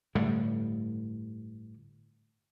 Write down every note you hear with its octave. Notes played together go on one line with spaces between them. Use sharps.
G1 A2 D3 G3